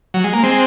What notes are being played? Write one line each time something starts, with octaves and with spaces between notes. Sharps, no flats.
F#3
G#3
A#3
G#3 C4